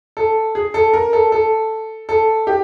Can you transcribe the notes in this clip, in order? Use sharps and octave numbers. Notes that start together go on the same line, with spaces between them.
A4
G#4
A4
A#4
A4
A4
A4
G4